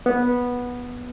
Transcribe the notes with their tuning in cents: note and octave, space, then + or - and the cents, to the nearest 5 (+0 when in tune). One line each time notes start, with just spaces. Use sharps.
B3 -10